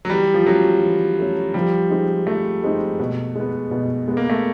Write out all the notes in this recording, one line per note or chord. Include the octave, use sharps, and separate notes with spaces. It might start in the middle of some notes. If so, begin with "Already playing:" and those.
F#3
E3 G3
F3
F#3 A3 C#4
E3
A3 C#4
F3 G3
G#3 C4 D#4
F3 A3
G#3 C4 D#4
B2
G#3 B3
B2
G#3 B3
A#3
A3